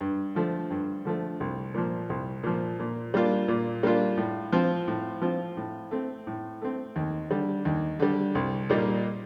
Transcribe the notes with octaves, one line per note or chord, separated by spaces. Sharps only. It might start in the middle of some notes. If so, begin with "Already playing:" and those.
G2
D3 F3 A3
G2
D3 F3 A3
C2
A#2 F3
C2
A#2 F3
A#2
G3 A#3 D4 F4
A#2
G3 A#3 D4 F4
A2
F3 C4 F4
A2
F3 C4 F4
A2
A3 C4
A2
A3 C4
D#2
D3 G3
D#2
D3 G3
C2
A#2 G3 A#3 D#4